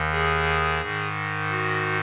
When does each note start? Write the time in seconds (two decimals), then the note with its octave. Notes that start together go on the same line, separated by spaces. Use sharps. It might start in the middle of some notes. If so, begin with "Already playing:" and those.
Already playing: D#2 D#3
0.12 G#4
0.81 G#2 D#3
1.50 F#4